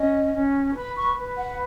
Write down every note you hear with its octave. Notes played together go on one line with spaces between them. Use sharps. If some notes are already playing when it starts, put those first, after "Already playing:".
Already playing: C#4 D#5
C#4
B4 B5
C#6
B4
F#5